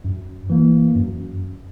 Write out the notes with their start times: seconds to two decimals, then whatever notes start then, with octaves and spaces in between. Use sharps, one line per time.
0.05 F#2
0.50 E3 A#3
0.95 F#2